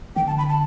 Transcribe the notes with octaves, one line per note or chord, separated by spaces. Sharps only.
D3 G5
A5
B5
A5